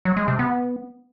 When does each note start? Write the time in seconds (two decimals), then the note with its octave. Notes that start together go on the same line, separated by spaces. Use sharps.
0.05 F#3
0.17 G#3
0.28 C3
0.39 B3